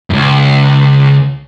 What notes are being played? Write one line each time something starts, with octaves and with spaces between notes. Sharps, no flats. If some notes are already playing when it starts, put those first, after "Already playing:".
C#2 F#2